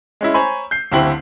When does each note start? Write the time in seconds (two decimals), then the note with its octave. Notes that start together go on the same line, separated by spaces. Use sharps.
0.21 G#3 C#4 E4
0.34 C5 C#5 G#5 A#5 B5
0.71 G6 C7
0.92 F#1 D2 C4 E4 G4 F#7